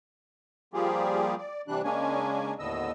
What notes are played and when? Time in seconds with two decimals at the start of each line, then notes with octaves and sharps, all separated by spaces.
0.74 F3 G3 A#3 F4 G4 G#4
1.38 D5
1.68 C3 E3 G3 D4 F#6
1.84 C#3 G#3 A#3 C#4 D4 G#5
2.59 D#2 A2 D3 B3 D#5 E6